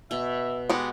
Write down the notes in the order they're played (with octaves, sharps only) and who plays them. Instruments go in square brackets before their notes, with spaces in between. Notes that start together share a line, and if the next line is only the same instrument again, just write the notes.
[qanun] B2 [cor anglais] E5
[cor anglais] G#3 [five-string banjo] B3 F#4 G4